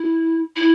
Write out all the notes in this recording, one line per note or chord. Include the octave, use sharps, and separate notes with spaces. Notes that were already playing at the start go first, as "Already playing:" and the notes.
Already playing: E4
E4